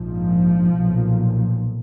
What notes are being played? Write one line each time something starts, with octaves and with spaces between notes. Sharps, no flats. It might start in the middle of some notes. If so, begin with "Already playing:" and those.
Already playing: A#1 G#2 F3
B1 A#2